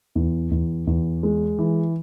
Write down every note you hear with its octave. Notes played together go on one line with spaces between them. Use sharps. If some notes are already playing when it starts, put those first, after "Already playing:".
E2
E2
E2
G#3
E3